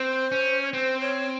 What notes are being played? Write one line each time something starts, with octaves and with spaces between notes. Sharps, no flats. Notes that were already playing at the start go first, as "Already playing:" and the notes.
Already playing: C4 C5
C#4
C#5
C4 C5
C#5